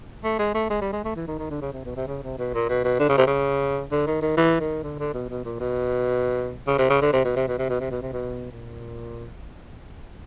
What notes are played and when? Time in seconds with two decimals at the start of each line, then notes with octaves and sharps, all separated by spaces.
0.24 A3
0.39 G#3
0.55 A3
0.70 G#3
0.81 G3
0.93 G#3
1.04 A3
1.16 E3
1.27 D#3
1.39 D#3
1.50 D3
1.61 C#3
1.73 C3
1.85 B2
1.96 C3
2.07 C#3
2.23 C3
2.38 B2
2.54 A#2
2.69 B2
2.84 B2
3.00 D3
3.09 C#3
3.18 C3
3.27 C#3
3.92 D3
4.07 D#3
4.22 D#3
4.37 E3
4.60 D#3
4.83 D3
4.99 D3
5.14 B2
5.30 B2
5.45 A#2
5.60 B2
6.67 C#3
6.78 C3
6.90 C#3
7.02 D3
7.13 C3
7.25 B2
7.36 C3
7.48 B2
7.59 C3
7.69 B2
7.80 C3
7.91 B2
8.02 C3
8.13 B2
8.51 A#2